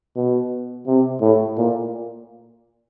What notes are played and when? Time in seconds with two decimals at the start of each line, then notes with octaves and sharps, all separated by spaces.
0.16 B2
0.87 C3
1.21 A2
1.57 A#2